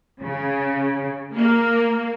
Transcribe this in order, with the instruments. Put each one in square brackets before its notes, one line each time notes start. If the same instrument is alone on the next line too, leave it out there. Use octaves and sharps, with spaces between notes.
[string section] C#3
A#3